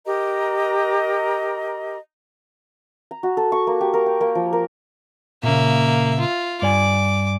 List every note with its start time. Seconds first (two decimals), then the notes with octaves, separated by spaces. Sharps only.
0.05 G4 A#4 D#5 A#5
3.11 A#5
3.23 F#4
3.37 A4
3.52 C#6
3.67 A#3
3.81 G4
3.94 A#4
4.06 G5
4.21 A#3
4.35 F3
4.53 A#4
5.43 A#2 C#3 A#3 E5
6.20 F4
6.62 G2 D5 G#5 D6